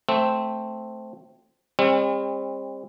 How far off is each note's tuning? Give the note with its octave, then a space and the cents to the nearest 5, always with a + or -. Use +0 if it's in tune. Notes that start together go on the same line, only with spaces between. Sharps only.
A3 +0 C4 +0
G3 +45 C4 +35